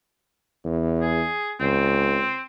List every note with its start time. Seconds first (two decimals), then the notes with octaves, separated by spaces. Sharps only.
0.65 E2
1.01 G#4
1.60 C#2 C4